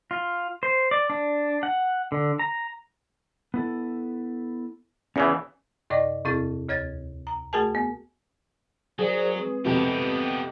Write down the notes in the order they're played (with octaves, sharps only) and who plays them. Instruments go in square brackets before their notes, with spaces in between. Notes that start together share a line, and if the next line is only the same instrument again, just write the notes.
[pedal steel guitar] F4
C5
D5
D4
F#5
D3
A#5
[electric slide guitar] B3 E4 A4
[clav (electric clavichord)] E2 C#3 E3 [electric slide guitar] C#4
[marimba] F#2 C3 D5 D#5 D6 A#6
E2 C3 C4 E4 G#4 A6
D2 C#5 G#6 A6
A#5
A3 F#4 G#4 A#4 G#5 A5
B3
[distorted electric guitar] F#3 [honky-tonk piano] G#4 [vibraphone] A#4 C5 D5
[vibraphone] G#3 C4 B4
[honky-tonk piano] F2 C3 F3 [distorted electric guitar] B3 G4
[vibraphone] G5